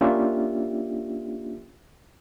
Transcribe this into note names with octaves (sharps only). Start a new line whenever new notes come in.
A#3 C#4 D4 F4 G4 E5